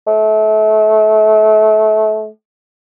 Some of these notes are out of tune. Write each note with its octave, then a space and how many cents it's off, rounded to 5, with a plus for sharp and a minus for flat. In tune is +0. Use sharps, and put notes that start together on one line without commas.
A3 -30